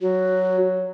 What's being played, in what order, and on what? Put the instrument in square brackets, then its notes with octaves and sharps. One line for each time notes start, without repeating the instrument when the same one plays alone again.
[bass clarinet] F#3 [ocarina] F#4